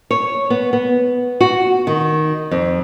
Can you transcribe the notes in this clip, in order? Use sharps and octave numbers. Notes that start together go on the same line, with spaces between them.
C#5
B3
B3
F#4
D#3
F2